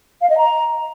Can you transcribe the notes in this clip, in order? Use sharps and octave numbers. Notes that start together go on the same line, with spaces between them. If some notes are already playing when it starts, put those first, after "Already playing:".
F5
D#5
A#5